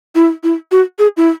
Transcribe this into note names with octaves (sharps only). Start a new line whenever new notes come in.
E4
E4
F#4
G#4
E4